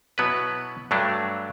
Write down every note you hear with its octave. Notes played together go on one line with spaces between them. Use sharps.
B2 F#3 B3 E4 B4
G2 F#3 A3 D4